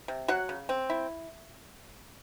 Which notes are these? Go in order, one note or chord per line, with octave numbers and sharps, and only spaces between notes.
C3
F#3 F#4 F#5
C#3
C4
E4